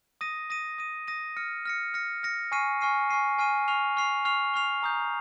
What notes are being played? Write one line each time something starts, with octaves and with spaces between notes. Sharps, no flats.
D#6 A#6 D#7
D#6 A#6 D#7
D#6 A#6 D#7
D#6 A#6 D#7
F6 A#6 C#7
F6 A#6 C#7
F6 A#6 C#7
F6 A#6 C#7
G#5 C#6 F6 C7 D#7
G#5 C#6 F6 C7 D#7
G#5 C#6 F6 C7 D#7
G#5 C#6 F6 C7 D#7
C#6 F6 C7 F7
C#6 F6 C7 F7
C#6 F6 C7 F7
C#6 F6 C7 F7
A#5 D#6 G6